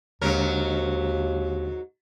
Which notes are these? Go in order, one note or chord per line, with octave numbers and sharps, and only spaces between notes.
D#2 G#2 D3 F#3 G#3 D4 A#4